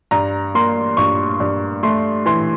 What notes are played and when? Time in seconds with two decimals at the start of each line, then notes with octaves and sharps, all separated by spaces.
0.11 G2 A#5
0.55 A#3 C6
0.97 G2 C#6
1.40 G2
1.83 A3 C6
2.26 E3 C6